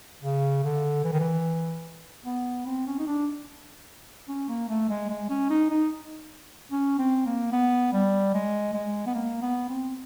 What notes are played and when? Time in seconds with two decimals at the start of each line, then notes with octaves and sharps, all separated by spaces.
0.23 C#3
0.64 D3
1.04 E3
1.12 D#3
1.20 E3
2.25 B3
2.66 C4
2.87 C#4
2.99 D#4
3.07 D4
4.28 C#4
4.49 A#3
4.69 A3
4.89 G#3
5.10 G#3
5.30 C#4
5.50 D#4
5.70 D#4
6.72 C#4
6.99 C4
7.26 A#3
7.53 B3
7.93 G3
8.34 G#3
8.74 G#3
9.07 B3
9.15 A#3
9.42 B3
9.69 C4